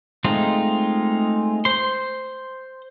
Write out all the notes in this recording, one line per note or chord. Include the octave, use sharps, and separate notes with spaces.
G#3 A3 C4 D#4 F4
C5 C6